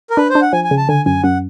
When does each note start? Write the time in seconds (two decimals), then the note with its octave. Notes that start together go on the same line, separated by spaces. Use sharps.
0.10 A#4
0.17 D4 B4
0.30 C5
0.35 D4
0.41 F#5
0.53 F3 G#5
0.64 G#5
0.71 C#3
0.77 A5
0.88 D3 G#5
1.06 F#2 G#5
1.23 F#2 F#5